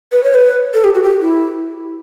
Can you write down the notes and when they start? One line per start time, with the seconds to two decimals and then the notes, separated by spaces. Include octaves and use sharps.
0.12 B4
0.24 C#5
0.34 B4
0.74 A4
0.84 G4
0.95 F#4
1.03 G4
1.21 E4